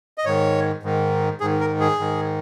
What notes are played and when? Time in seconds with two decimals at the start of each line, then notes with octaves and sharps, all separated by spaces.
0.18 D#5
0.25 G#2 D#3 C#5
0.83 G#2 D#3
1.40 G#2 D#3 G#4
1.60 A#4
1.80 G#4
1.99 G#2 D#3